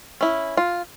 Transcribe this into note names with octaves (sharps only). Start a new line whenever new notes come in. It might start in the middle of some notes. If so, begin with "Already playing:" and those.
C#4 E4
F4